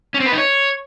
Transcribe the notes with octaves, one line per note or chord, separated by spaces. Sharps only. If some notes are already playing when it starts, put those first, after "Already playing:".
C#4
C4
B4
D#4
C#5